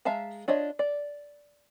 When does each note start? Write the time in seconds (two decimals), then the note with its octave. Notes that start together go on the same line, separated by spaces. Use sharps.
0.05 G#3 E5 F5 A5 A#5
0.48 D4 F4 C#5 D#5
0.79 D5